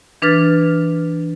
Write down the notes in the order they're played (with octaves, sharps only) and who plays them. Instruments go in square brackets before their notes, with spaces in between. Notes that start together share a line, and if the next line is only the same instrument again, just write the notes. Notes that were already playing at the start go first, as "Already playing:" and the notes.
[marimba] E3 D4 B4 F6 A6